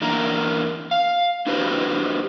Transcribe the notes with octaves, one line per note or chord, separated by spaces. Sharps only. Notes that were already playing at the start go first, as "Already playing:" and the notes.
E2 A#3 D4 E4 A#4 A#5
F5
D4 E4 F#4 G4 B4 C5